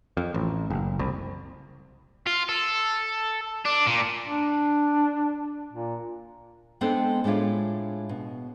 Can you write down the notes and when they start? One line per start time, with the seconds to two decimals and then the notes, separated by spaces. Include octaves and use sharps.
0.17 F2
0.34 A1
0.70 F#1
0.99 C2
2.27 F4
2.49 A4
3.65 D4
3.87 A#2
4.26 D4
5.73 A#2
6.81 G#3 B3 C4 D4 A4 C5
7.24 A2 G#3 D4 E4 F4
8.09 B2